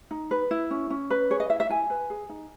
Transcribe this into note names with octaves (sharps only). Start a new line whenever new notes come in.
D#4
B4
E4
C#4
C#4
B4
G#4 C#5
D#5
E4 E5
E5
E4 G#5
B4
G#4
D#4